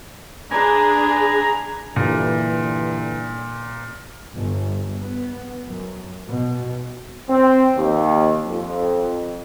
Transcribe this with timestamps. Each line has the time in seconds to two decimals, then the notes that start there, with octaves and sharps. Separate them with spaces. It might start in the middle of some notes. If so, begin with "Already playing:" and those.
0.51 D4 G#4 B4 G#5 A#5
1.96 G2 A#2 D3 E3
4.36 G1
5.02 B3
5.67 F#2
6.26 B2
7.29 C4
7.75 D#2
8.45 F2